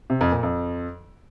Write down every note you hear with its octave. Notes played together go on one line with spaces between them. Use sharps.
C3
F2
A#2
F2